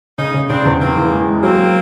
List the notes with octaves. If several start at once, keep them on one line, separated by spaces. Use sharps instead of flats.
C#3 C#4 D#4
C#3
C#3 C4 D4
E2
E3 A#3 C4
E3
G#3
G#3
F#3 A#3 C4